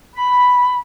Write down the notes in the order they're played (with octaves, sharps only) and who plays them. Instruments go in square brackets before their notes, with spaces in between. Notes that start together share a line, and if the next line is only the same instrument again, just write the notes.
[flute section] B5